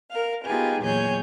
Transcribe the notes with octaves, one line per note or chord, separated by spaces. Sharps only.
A#4 F5
B3 D#4 F4 G4 G#4 B4
E2 A#2 F#3 G#4 C#5 G6